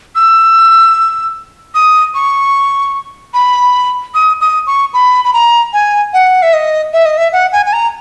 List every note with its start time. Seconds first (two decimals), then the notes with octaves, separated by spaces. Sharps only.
0.15 E6
1.74 D#6
2.14 C#6
3.34 B5
4.14 D#6
4.41 D#6
4.67 C#6
4.93 B5
5.25 B5
5.33 A#5
5.73 G#5
6.13 F#5
6.42 E5
6.53 D#5
6.93 E5
7.05 D#5
7.17 E5
7.33 F#5
7.52 G#5
7.66 G#5
7.73 A#5